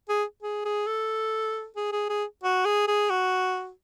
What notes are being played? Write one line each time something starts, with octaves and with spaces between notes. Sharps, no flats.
G#4
G#4
G#4
A4
G#4
G#4
G#4
F#4
G#4
G#4
F#4